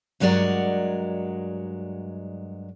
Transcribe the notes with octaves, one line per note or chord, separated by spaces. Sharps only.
G2 F#3 G#3 A#4 D5 F#5